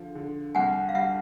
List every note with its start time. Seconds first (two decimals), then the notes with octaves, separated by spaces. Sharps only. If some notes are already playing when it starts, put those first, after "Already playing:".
Already playing: D3 F3
0.15 D3
0.55 C2 F#5 G#5
0.89 F5
0.95 G3 E5 F#5